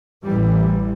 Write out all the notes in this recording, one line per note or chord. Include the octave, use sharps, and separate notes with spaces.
A1 E3 G3